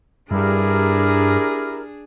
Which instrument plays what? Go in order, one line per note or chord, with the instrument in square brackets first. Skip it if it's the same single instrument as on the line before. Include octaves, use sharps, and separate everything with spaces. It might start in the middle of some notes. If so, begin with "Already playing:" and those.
[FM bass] G2 [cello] D4 G#4 [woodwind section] E4 G4 A#4